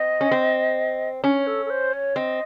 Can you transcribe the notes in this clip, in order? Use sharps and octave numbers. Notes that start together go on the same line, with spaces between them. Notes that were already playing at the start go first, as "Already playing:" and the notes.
Already playing: C4 D#5
C#4
C4
C#4 C#5
A4
A4
C5
C#5
C4 D#5